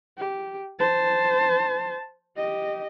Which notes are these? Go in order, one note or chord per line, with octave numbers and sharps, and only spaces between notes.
G4
C5 A5
G4 D#5